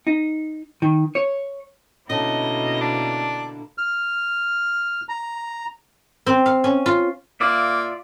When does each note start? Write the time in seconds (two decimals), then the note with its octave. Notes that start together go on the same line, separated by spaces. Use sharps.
0.07 D#4
0.82 D#3
1.15 C#5
2.10 B2 D3 A#3 C#4 E4 C#5 D#5 A5
2.81 D4
3.78 F6
5.09 A#5
6.26 C4
6.46 F5
6.64 C#4
6.86 F4
7.40 A#3 F4 D5 E5